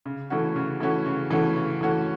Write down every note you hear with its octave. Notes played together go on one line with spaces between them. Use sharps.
C#3
E3 A3 C#4 F#4
C#3
E3 A3 C#4 F#4
C#3
E3 A3 C#4 F#4
C#3
E3 A3 C#4 F#4